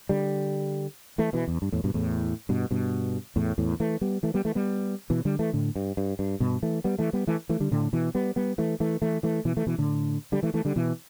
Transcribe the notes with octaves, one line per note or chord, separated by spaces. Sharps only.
D3 G3
E3 A3
B2 E3
E2
G2
E2 A2
G2 B2
E2 A2
G2 B2
G2 B2
E2 A2
E2 A2
E3 A3
G3 B3
E3 A3
G3 B3
E3 A3
G3 B3
B2 E3
D3 G3
E3 A3
A2 D3
G2
G2
G2
G2 B2
E3 A3
G3 B3
E3 A3
G3 B3
E3 A3
E3 A3
D3 G3
A2 D3
B2 E3
G3 B3
G3 B3
E3 A3
E3 A3
E3 A3
E3 A3
B2 E3
E3 A3
B2 E3
A2 D3
D3 G3
E3 A3
E3 A3
D3 G3
B2 E3